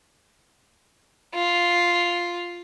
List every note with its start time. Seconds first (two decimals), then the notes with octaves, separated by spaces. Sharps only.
1.34 F4